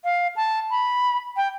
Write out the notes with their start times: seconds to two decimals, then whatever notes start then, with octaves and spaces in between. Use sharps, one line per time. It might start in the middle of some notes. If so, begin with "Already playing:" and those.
0.04 F5
0.36 A5
0.70 B5
1.36 G5